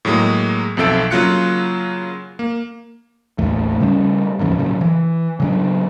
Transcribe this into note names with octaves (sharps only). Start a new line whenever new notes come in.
A2 F#3 G#3 A#3
B1 F2 C4 A4 E5 D7
C#3 F#3 A#3 F4 F#6 C#7
A#3
A1 D#2 A3
C#3 G3 C4 C#4
D1 D#2 C#3 F3
A#2 C#3 F#3
E3
C#3 F#3 D4